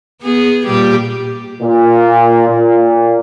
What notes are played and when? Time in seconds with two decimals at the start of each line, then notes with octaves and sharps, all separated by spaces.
0.22 B3 G#4
0.66 A#2 G3 G4
1.62 A#2
2.49 A#2